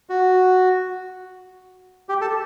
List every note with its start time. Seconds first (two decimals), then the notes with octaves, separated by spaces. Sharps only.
0.09 F#4
2.09 G4
2.21 A4